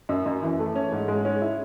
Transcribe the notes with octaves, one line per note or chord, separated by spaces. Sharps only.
F#2
F#2
E3
A3
C#4
G#2
G#3
C#4
E4